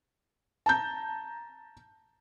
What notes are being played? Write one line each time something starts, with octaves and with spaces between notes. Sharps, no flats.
A5 A#5 G6